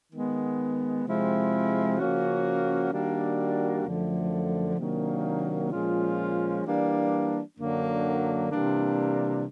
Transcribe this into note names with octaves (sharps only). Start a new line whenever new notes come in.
D#3 G#3 B3
C3 F3 G#3 C4 E4
C#3 F3 A#3 C#4 F#4
D#3 G3 A#3 D4 F#4
F#2 D3 F3 A3
C3 D#3 F#3 A#3 D4
A#2 F3 G#3 C#4 F4
E3 G3 A#3 D4
F#2 D3 F#3 A#3 D4
C3 E3 G3 A#3 D4